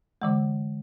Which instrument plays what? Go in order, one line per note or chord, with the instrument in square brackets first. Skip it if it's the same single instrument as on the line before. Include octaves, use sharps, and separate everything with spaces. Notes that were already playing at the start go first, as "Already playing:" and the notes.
[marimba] D3 E3 G#3